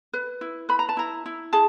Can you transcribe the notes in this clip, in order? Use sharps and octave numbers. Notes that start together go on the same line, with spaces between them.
B4
E4
B4 B5
A#5
A5
E4 A#5
E4
G#4 A5